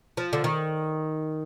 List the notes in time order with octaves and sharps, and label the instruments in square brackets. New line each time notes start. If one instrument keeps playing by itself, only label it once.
[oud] F3
D3
D#3